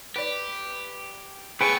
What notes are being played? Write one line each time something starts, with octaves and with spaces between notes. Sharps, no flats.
G4 B4 D5
A3 B3 G#4 B4 C5 G5 C#6 D#7